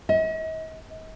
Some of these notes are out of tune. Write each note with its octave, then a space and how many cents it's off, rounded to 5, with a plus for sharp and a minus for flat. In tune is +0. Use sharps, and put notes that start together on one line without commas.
D#5 +45